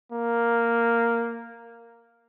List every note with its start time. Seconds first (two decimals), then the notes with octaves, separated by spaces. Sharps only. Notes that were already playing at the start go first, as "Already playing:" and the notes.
0.12 A#3